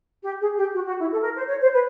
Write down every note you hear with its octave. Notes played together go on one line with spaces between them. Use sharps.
G4
G#4
G4
F#4
F#4
E4
A4
A#4
C5
C#5
C5
B4